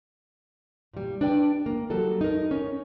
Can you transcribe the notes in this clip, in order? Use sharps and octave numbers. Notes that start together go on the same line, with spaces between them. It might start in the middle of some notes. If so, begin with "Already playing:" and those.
A#2 G3
D4 B4 D5 G5
A#3
F#3 G3 A4
D#4 A#4
C#4